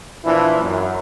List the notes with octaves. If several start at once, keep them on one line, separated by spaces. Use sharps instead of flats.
A#2 E3 F3 D4 E4
F#2